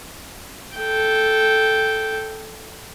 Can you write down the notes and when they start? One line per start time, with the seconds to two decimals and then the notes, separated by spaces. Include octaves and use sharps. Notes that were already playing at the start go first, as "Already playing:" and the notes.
0.77 A4 G5